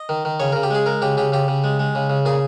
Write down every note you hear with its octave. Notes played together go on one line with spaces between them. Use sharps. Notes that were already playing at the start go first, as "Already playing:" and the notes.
Already playing: D#5
D#3
D#3
C#3 C#5
C#3 A#4
G4
G#3 G#4
G#3 A#4
C#3 G4
C#3 G4
C#3 G4
C#3
G#3
G#3
C#3
C#3
A#2 G#4